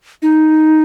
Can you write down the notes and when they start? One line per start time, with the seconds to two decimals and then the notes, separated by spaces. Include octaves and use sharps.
0.22 D#4